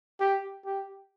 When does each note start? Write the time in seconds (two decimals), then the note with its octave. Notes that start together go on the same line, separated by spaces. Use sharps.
0.20 G4
0.65 G4